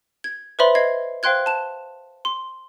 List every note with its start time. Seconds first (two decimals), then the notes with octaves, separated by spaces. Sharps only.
0.24 G#6
0.59 B4 C5 D5 E5 B5 C6
0.75 D#5 G#6 C7
1.23 C5 F5 G5 C6 F#6 G#6
1.46 A5 E7
2.25 C6